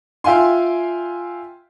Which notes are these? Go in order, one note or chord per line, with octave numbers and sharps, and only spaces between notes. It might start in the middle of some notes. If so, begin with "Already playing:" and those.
F4 E5 F5 G5 G#5 C6